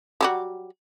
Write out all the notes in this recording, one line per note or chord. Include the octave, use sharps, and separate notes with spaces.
F#3 G3 F#4